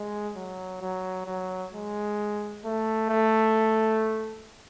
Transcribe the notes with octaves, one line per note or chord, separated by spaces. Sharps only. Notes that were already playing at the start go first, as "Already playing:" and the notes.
Already playing: G#3
F#3
F#3
F#3
G#3
A3
A3